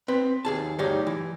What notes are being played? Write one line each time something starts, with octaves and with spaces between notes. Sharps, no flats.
C4 B4
D#2 G#4 A5
D2 G2 D#4 G4 C#5
E3